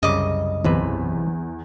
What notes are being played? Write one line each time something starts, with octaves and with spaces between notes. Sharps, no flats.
C2 F#2 C#3 G3 D#5 D6
B1 E2 C3 B4